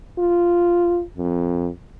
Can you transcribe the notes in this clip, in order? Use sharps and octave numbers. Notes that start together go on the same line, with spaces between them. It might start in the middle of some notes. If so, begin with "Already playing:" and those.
F4
F2